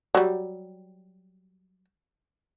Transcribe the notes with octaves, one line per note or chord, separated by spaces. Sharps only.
F#3 G3